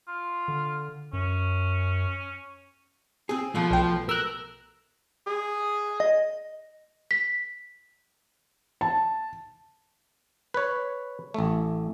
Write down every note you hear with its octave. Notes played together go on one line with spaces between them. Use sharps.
F4
D3
F#2 C#4
C4 G#4
B2 F3 A3
B1 G5
A#4 E6 F#6
G#4
D#5
B6
A5
B4 C#5
A1 A3